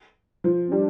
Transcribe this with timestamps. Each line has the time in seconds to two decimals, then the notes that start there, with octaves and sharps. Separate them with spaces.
0.44 F3
0.68 C4
0.71 G3 D4